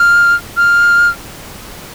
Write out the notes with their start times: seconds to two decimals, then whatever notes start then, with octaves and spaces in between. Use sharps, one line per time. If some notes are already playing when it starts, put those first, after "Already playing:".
Already playing: F6
0.57 F6